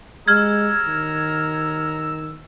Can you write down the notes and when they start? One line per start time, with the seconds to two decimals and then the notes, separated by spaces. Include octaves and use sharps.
0.28 G#3 A#5 E6 F6 G#6
0.86 D#3